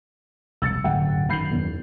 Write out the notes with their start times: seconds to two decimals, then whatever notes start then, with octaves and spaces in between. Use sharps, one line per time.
0.62 E1 C2 E6 A6 C#7
0.84 D1 G1 F#2 F#5 G5
1.29 F#2 D#3 B5 G6 C7
1.51 E1 E2